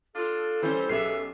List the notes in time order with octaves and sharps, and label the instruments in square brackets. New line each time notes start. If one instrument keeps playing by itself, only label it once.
[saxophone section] D4 F4 [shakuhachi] A4
[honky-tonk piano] E3 C#4 [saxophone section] G3 C5
[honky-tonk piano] B1 [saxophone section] C#3 B4 E5 [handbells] C#4 G4 C7